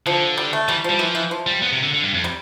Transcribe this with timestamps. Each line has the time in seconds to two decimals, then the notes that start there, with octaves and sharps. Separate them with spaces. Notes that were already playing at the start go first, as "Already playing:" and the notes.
0.06 D3 F3
0.38 G3
0.53 A3
0.68 E3 G3
0.84 F3
0.90 G3
0.99 E3 F3
1.15 E3
1.31 F3
1.47 G3
1.62 B3
1.72 C3
1.83 D3
1.93 D3
2.04 G2
2.14 F2
2.24 G3